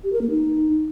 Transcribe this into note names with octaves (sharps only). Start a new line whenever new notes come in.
G4
A#4
A#3
D#4